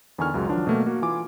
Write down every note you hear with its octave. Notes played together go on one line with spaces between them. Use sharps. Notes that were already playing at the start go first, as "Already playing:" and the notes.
E2 D3 D#3 G#5 C#6 F6
C#2 F#2 F#3 G#3
D#3 F3 F#3 D4
B2 F#3 A3 A#3
A#3 F#4
E3 F4 G#5 D6